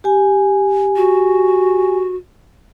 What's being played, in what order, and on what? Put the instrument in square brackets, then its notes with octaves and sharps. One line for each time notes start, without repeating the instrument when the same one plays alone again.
[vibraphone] G4 G#5
[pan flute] F#4